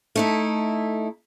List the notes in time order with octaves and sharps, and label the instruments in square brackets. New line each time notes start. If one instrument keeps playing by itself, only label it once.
[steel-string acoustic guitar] A3 D#4 E4